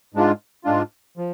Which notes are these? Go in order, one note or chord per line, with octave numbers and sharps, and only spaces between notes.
G#2 G#3 D4 F4
G#2 G#3 D4 F4
F3